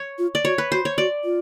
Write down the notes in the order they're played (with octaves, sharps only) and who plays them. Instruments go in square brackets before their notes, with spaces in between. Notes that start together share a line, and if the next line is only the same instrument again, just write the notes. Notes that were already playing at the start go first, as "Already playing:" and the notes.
Already playing: [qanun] C#5
[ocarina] F4
[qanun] D5
[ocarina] F#4 [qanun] C#5
[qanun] B4
[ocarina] F#4 [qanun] C5
[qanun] C#5
[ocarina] F#4 [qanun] D5
[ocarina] F4